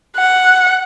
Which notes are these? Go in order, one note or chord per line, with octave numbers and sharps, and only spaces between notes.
F#5